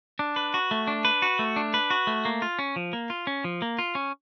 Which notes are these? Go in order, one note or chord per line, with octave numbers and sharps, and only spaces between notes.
D4
B4
F#4
A3
D4
B4
F#4
A3
D4
B4
F#4
A3
A#3
F4
C#4
F3
A#3
F4
C#4
F3
A#3
F4
C#4